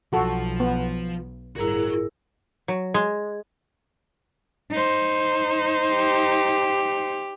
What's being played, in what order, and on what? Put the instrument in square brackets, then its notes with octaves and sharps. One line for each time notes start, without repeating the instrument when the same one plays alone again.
[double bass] B1 [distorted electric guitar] F3 [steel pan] F#4 A4
[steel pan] B3
[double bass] G1 A2 [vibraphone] E4 G#4 A#4 [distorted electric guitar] F#4 A#5
[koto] F#3
G#3
[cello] D#4 C5
[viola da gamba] G4